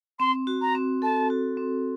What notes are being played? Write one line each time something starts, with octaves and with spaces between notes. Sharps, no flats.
C4 C6
F#4
A#5
C4
A4 A5
F#4
C4